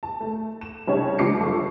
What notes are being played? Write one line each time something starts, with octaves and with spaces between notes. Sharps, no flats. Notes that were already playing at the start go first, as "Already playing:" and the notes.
A5
A3
E7
C2 C#4 D4 G4 C#5
C#2 F3 D4 D6 C7 C#7
G1 A4 C#6